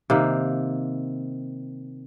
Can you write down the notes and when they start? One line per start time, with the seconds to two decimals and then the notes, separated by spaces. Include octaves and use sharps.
0.10 C3 D#3 A#3